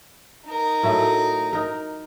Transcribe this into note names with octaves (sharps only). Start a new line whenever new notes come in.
D#4 A#4
A2 F#3 A3
D#4 A#4